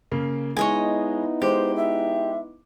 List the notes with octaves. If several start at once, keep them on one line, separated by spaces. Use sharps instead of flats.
C#3 A#3
G#3 B3 D#4 E4 C#5 D#5 G#5
G#3 G4 C5
E5